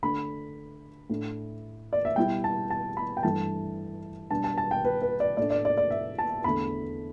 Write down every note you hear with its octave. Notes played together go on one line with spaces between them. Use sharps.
D3 A3 D4 B5
A2 A3 D4
D5
E5
B2 G3 E4 G5
A5
A5
B5
G5
G2 E3 A3 D4 A5
B2 G3 B3 D4 A5
A5
A5
G5
B4
B4
D5
A2 A3 D4 D5
D5
D5
D5
E5
A5
E2 D3 A3 B5